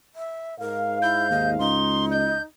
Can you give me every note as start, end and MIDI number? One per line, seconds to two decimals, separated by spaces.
0.15 0.58 76
0.60 1.77 44
0.60 0.99 70
0.60 1.77 77
1.02 1.30 64
1.02 1.50 91
1.30 1.55 39
1.30 1.54 75
1.59 2.38 37
1.59 2.44 63
1.59 2.05 84
2.11 2.37 75
2.11 2.41 91